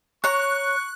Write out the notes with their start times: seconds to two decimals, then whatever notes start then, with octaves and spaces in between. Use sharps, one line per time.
0.24 C#5 A#5 C#6 F#6